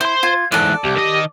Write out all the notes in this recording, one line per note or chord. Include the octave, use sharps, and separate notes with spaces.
E4 C5 C6
F4 G#6
E2 G#2 A4 D5 F#6
C2 G4
D#3 D#5